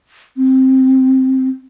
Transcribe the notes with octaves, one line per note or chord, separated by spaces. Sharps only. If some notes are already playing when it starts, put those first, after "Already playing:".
C4